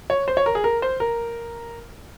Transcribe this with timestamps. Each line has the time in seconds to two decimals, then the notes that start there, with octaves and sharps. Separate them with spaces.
0.10 C#5
0.28 C5
0.37 C#5
0.46 A#4
0.55 G#4
0.64 A#4
0.82 C5
1.00 A#4